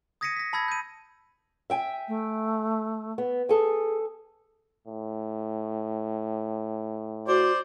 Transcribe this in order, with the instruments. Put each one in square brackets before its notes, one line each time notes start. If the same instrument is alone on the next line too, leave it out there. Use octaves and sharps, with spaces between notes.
[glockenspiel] D#6 G#6 A#6 B6 C#7 D#7
A#6 B6
A5 B5 E6 G#6 A#6
G6 D#7
[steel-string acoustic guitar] E5 G5 G#5
[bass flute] A3
[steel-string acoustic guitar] B3
[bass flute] G#4 [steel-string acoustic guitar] A4 G#5
[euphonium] A2
[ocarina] F#4 [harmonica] C5 D5